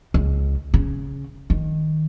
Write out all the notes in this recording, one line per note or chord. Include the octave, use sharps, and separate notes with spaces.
C#2
C#3
D#3